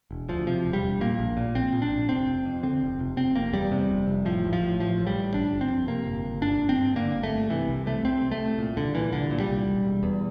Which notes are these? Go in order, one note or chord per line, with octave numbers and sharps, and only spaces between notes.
E1
D2 F3
C3 F3
E1
G3
E1
A#2 A#3
A#1
A#2
A#1 C4
A#2
D4
A#1
F1 C4
F1
F2
D3 C4
F1
F1
F1 C4
F1 A#3
E2 G3
C3
F1
F1
A2 F3
A1
F3
A2
A1 F3
A2
G3
A1
G1 D4
G1
C4
F2
C3 A#3
G1
G1
G1 D4
G1
C4
G2
D3 A#3
G1
A3
G1
C3 E3
C2
C3 A3
C2 C4
C3
A3
C2
A#2
C2 D3
A#2 E3
C2 D3
A#2
G3
C2
E1
E1
E2